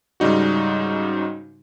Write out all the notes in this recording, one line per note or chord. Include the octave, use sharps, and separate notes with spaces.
G#2 C#3 G3 D#4 F#4